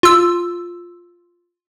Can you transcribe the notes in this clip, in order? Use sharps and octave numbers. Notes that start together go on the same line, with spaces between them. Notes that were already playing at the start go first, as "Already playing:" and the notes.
F4 E6